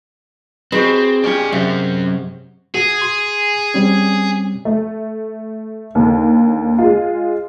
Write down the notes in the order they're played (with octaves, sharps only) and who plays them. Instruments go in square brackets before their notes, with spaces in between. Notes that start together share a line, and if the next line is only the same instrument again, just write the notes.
[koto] G#3 [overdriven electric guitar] C4 [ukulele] F#4 G4 B4
[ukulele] C#4 G4 [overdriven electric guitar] D5 G#5
[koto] C3 [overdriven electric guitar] F#3 C#4 [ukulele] E5
[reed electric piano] F#4 [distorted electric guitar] G#4
[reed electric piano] C6
G3 C4 C#4
[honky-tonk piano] A3
D#2 D3
G#3 F4